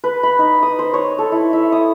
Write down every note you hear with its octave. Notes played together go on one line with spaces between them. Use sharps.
B4
B5
D#4
D#6
C5
C#5
A4
E4
E5
D#6